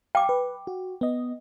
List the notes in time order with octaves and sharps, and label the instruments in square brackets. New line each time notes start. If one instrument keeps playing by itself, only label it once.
[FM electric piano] F5 [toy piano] G5 D6
[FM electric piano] B4
F#4
B3 D#5